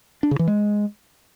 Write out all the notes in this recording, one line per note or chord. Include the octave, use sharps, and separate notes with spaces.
D4
C#3
E3
G#3